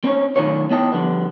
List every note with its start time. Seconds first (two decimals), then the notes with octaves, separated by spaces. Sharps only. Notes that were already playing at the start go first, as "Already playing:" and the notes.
0.04 C4 C#4 D#4 C#5
0.36 B1 D#3 A3 D4 F4 C#5
0.70 B3 E4 C#5 D#5 G5 A5
0.91 D3 F3 G3 B3